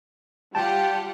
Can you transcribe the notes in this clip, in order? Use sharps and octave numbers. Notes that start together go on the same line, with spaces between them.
G3 F4 G4 F#5 G5 A5